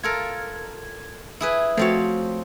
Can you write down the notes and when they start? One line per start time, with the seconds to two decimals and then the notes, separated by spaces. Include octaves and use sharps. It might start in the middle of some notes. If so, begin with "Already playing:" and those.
0.03 F4 A4 A#4 G#6
1.41 E4 G#4 B4
1.77 F3 A3 C4 F#4 C#5